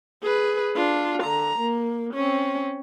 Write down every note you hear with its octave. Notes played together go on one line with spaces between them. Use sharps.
G#4 B4
D4 F4
D3 A#5
A#3
C4 C#4